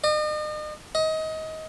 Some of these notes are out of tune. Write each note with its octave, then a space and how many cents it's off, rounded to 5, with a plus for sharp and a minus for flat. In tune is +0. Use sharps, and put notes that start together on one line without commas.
D#5 -40
D#5 +25